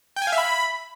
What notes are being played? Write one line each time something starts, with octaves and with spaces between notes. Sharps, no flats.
G5
G#5
F5
E5
B5